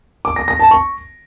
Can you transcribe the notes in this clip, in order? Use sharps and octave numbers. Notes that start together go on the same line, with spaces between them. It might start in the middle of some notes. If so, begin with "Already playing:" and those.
D6
A#6
A#6
A5
C#6